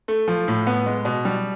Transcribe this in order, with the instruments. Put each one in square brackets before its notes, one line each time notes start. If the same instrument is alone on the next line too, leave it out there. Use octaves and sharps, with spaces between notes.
[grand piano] A3
F3
A2
B3
G#3
B2
G3